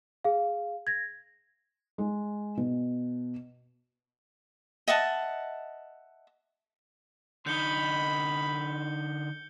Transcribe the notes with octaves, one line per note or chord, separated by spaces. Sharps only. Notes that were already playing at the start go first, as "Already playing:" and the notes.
G#4 F5
G#6 A#6
G#3
B2
D#5 E5 F#5 A5
D3 D#4 B5 G6 C#7 G7